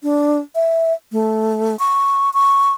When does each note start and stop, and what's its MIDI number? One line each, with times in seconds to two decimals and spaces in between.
0.03 0.38 62
0.55 0.93 76
1.12 1.79 57
1.79 2.33 85
2.34 2.72 85